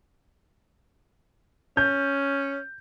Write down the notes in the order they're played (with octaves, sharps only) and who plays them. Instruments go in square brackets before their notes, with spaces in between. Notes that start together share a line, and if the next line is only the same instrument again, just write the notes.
[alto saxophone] C#4 [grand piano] G6